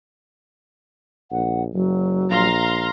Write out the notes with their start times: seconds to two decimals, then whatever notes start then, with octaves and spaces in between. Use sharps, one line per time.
1.32 A#1 F#5
1.74 F#1 F#3
2.30 A#1 F5 A#5 C6